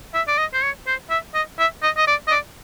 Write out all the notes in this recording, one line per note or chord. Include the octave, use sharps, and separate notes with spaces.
E5
D5
D#5
C5
C#5
C5
E5
D#5
E5
D#5
D#5
D5
D#5
D5